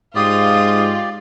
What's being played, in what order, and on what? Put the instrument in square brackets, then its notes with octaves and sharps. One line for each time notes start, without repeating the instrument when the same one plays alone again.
[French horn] G#2 [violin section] F4 [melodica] G4 D5 [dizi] D#6